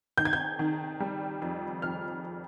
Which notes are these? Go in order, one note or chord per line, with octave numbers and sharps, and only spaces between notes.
D#3 G6
G#6
G6
D#3
G3
F2
F2 F6